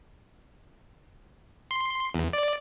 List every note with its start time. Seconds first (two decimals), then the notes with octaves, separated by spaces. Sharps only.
1.71 C6
2.14 E2
2.33 D5